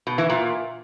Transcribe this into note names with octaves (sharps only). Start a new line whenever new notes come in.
B2
E3
A#2